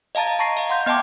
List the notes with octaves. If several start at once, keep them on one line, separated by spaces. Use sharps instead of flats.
D#5 F5 A5 A#5 A6
D#5
A5 A#5 C#6 A#6 C7
D#5 F5
F#5 C6 G6
B3 D#5 G5 A5 D6